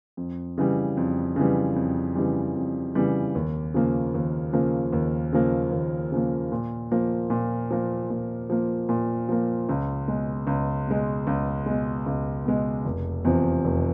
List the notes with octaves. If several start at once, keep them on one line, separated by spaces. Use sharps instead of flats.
F2
C#3 E3 G3
F2
C#3 E3 G3
F2
C#3 E3 G3
F2
C#3 E3 G3
D#2
C#3 F3 A#3
D#2
C#3 F3 A#3
D#2
C#3 F3 A#3
D#2
C#3 F3 A#3
A#2
F3 A#3
A#2
F3 A#3
A#2
F3 A#3
A#2
F3 A#3
C#2
B2 G#3
C#2
B2 G#3
C#2
B2 G#3
C#2
B2 G#3
F1
E2 C3 F3
F1